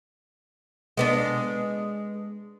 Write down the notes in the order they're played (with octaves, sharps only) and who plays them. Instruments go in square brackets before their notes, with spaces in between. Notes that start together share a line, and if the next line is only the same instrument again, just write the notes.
[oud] G#3 B3 D4